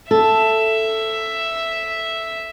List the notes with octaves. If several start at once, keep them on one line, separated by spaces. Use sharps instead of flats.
A4 E5